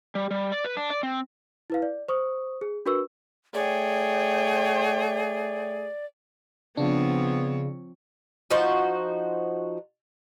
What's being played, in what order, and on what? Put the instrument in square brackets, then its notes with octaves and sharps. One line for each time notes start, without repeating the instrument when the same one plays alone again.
[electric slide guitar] G3
G3
D5
B4
D4
D5
C4
[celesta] E4 B4 F5
D5
C5 C#6 D#6
G#4
D4 F#4 A#4 B4 C#6 E6
[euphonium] A3 [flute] G#4 [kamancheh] C#5 G5 [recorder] D5
[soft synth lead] C#3 [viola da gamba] F3 C4 C#5 [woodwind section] B3 [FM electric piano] D4
[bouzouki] F3 D#4 F#4 C5